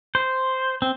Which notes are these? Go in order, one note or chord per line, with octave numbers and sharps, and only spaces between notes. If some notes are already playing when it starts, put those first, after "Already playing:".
C5
C4